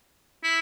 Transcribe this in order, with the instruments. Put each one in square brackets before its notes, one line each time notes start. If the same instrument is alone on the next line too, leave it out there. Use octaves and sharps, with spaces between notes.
[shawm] E4